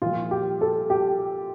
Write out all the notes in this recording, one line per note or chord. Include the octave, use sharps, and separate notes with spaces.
A#2 F3 F4
G4
A4
G4